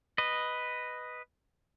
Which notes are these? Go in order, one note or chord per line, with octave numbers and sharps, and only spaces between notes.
B4 D#5